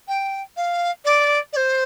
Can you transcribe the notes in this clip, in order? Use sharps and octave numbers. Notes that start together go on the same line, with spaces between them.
G5
F5
D5
D5
C5